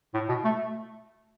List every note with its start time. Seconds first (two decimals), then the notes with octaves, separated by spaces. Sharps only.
0.14 A2
0.29 B2
0.44 A3